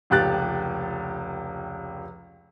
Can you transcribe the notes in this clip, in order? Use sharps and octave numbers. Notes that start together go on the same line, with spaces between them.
F1 C#2 G4 F#6 A6